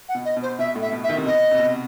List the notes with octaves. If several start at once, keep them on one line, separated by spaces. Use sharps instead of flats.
F#5
B2
D#5
B2
C5
B2 E5
A2
E5
B2
E5
D#3
C3
B2 D#5
C3
B2